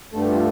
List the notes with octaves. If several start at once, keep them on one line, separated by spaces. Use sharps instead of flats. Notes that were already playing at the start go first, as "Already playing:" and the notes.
G2 D3 A3 A4
G4
F4 A4